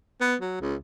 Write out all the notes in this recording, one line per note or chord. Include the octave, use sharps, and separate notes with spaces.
B3
F#3
C#2